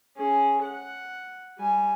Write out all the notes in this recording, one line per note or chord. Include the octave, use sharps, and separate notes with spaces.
C#4 G#4
F#5
G3 G#5